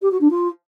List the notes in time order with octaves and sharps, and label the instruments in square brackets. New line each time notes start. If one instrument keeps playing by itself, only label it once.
[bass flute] G4
F#4
D4
F4